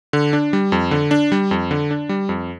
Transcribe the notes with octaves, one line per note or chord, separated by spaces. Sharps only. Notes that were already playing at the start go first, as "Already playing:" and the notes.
D3
D4
G3
F2
D3
D4
G3
F2
D3
D4
G3
F2